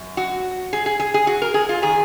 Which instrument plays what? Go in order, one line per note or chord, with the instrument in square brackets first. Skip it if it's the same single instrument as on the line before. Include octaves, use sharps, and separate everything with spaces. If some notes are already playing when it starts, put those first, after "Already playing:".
Already playing: [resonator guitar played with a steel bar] F#2
F#4
G#4
G#4
G#4
G#4
F#4
A#4
G#4
F4
D#3 G#4